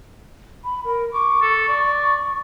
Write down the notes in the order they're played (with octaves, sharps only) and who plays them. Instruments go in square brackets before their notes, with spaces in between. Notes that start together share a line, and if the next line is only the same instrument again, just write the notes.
[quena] B5
A#4
[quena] C#6 [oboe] D6
[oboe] A4
D5